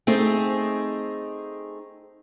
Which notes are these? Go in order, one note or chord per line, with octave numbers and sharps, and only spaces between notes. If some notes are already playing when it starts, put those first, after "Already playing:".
A3 C4 D#4 G#4